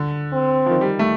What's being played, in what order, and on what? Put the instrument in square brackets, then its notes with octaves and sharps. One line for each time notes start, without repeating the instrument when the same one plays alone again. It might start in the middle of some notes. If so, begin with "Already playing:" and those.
Already playing: [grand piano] D3
[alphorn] C4
[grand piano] F3
D#3
G3
A3